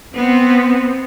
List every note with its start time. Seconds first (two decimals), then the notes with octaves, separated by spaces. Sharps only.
0.15 B3 C4